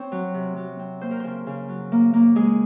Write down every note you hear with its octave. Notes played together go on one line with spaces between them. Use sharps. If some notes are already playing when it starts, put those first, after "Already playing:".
Already playing: C4 C#5
F#3
C3
F#3
C4
A#3 C5
A#4
C#3 C5
C#3
F#3
A#3
A#3
G#3 G#4